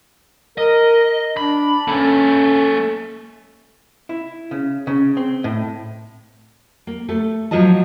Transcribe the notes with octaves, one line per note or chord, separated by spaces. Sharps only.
A#4 D#5
D4 B5
A#3 C#4 A4
E4
C#3
C#3
C4
A2
A#3
A3 A4
G#2 F3 F#3 F4 D#5 A5